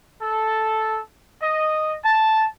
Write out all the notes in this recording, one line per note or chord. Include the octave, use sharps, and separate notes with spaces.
A4
D#5
A5